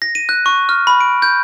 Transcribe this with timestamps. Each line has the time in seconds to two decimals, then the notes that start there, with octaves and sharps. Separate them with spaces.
0.02 A#6
0.15 D#7
0.29 F#6
0.46 C#6
0.69 F6
0.87 B5
1.01 D7
1.22 G6